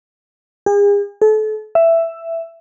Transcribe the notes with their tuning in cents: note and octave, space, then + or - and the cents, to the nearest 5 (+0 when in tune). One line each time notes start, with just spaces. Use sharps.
G#4 -40
A4 -35
E5 +10